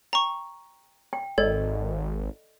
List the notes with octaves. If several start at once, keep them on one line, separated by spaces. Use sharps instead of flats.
G5 A#5 C#6
G5
G#1 A4 D5 D#5